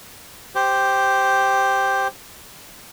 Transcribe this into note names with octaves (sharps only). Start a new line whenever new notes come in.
G4 C5